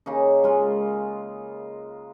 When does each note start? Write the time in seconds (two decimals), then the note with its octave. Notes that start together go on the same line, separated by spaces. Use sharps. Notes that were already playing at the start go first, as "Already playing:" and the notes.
0.06 C#3 A#3 D#4
0.44 G#3 F4